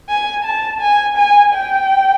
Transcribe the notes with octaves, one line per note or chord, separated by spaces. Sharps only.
G#5
A5
G#5
G#5
G5